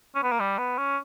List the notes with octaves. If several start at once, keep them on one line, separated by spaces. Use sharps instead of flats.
C#4
B3
A#3
G3
B3
C#4